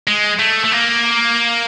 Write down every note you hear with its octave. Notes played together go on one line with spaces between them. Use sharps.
G#3
A3
A3
A#3